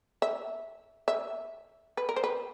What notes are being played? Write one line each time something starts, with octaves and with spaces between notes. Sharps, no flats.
E5
E5
B4
A#4
C5
B4